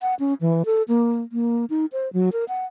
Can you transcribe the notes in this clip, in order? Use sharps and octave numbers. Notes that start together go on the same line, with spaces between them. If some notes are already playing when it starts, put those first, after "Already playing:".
F#5
C#4
E3
A4
A#3
A#3
D#4
C5
F#3
A#4
F#5